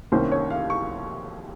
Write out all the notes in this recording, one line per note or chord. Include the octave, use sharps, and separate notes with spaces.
C2 C3 D#3 A#3 C#4 C5
C#5
F5
C#6